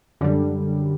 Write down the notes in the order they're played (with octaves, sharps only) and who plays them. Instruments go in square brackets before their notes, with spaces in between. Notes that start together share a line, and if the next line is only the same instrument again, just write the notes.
[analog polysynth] F#2 D3 G3